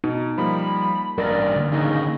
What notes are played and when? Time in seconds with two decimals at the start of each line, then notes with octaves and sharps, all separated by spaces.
0.04 B2 D#4
0.38 F3 G3 A#3 B5
1.18 A1 G2 A#2 A#4 D5 A#6
1.56 D3
1.72 D#2 C#3 D#4